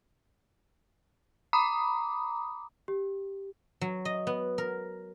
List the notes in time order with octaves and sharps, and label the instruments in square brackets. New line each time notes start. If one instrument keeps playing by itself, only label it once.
[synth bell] A#5 B5 D6 D#6
[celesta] G4
[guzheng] F#3
D#5
B3
A#4